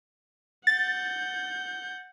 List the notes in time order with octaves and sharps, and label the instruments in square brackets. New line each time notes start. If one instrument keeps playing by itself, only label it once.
[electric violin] F#5 G6 [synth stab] A6